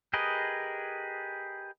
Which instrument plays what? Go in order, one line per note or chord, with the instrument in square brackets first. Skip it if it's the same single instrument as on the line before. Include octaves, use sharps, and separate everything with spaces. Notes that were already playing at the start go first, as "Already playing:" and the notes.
[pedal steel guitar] G4 G#4 A#4 B4 D#5